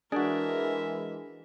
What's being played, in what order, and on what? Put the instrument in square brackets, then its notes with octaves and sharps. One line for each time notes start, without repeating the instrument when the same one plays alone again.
[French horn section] E3 G#3 [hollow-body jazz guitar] D4 [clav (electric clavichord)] F#4 G#4 [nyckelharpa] A#4 E5